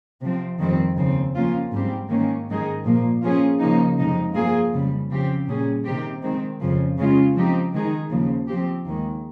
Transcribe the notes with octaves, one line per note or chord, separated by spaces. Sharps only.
C3 F3 C4
F2 D#3 G3 C4
D#2 C#3 F3 C4
F3 A#3 C#4 F4
G#2 G3 C4 G4
G#2 D#3 A#3 C#4
G#2 D#3 G#3 D#4 G#4
A#2 F3 A#3
F3 A#3 C#4 F4 G#4
C#3 F3 A#3 D#4
F2 C3 F3 G#3 D#4
G2 F3 A#3 F4 G#4
F2 C#3 G3
C#3 F3 C4 G4
A#2 G3 C#4 G#4
C3 D#3 G3 C4 G4
D#3 G#3 C4
F2 C#3 F3
C#3 G#3 C#4 F4
F3 C4 D#4 G4
D#3 G#3 D#4 G#4
D#2 C#3 F3
F3 C4 G4
D#2 D#3 G#3